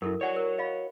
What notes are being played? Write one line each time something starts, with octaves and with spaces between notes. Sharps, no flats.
F#2 E4 A4 A#4
F#4 C#5 D5 F#5 G#5
A#4
D#5 F5 B5